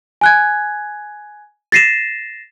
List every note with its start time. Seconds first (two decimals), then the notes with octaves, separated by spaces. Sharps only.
0.21 G#5 F#6 G#6
1.72 A6 A#6 C7 D#7 E7